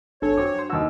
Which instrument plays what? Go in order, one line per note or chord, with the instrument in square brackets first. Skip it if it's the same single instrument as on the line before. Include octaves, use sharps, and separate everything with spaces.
[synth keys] G#1 A4 G#6 [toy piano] D4 [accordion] C#5
[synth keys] F#2 C4 F#4 [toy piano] D6
[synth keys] F#3 C5
[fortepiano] D#2 E6 [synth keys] F#4